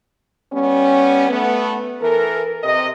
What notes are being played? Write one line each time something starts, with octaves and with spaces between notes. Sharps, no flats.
G3 B3 C#4
A3 B3
E3 A4 A#4
C3 D#5